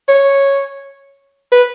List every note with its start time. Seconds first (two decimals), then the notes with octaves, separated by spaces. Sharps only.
0.08 C#5
1.52 B4